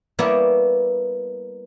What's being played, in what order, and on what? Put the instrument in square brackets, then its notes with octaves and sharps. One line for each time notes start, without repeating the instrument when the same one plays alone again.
[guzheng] G3 A#3 B3 E4 C#5 D5